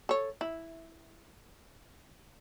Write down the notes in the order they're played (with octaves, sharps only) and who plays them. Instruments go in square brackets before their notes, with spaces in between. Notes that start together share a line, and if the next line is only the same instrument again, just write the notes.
[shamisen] A4 C#5
E4